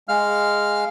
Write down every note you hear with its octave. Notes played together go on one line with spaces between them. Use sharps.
G#3 F5 F6